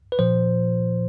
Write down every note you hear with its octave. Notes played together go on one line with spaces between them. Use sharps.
B4
A#2 F3 C5